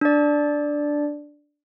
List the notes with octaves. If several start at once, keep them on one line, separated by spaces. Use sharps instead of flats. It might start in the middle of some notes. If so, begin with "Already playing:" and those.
D4 D5